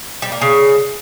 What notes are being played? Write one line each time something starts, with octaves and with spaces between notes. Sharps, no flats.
G3
A#3
C#3